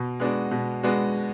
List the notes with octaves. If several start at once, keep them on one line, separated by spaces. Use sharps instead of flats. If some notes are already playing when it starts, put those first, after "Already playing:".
Already playing: B2
G#3 B3 D4 F#4
B2
G#3 B3 D4 F#4